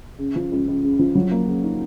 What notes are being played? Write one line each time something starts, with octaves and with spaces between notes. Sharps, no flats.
C#3
F3
C#2
C#2
C#3
F3
F#3
A#3
C#3
D#4